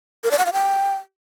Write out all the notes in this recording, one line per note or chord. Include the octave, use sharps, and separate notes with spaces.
A#4
D5
F#5
F5
G5